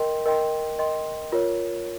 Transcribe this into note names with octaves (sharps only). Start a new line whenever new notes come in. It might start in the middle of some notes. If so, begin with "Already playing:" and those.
Already playing: A#4 D#5 G5 C6
A#4 D#5 G5 C6
A#4 D#5 G5 C6
F4 A#4 C#5